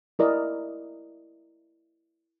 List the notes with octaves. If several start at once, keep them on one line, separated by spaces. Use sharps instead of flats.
E4 A#4 D5 D#5